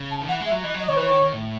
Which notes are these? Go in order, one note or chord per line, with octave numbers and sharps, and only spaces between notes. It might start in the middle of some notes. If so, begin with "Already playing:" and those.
Already playing: C#3
A5
D#3
E3 F#5
G#3
E5
F#3
E3 D#5
F#3
D#5
D#3 C#5
E3 B4
C#5
D#3
D#3
A2